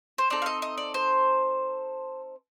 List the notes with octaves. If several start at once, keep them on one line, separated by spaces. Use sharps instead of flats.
C5
C4 D#4 A4 D5
F5
D#5
D#5
D5
C5